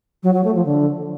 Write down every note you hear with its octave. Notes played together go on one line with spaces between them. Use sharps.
F#3
F#3
A3
F3
D3